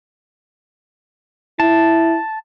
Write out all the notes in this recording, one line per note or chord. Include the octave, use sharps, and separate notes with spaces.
E4 A5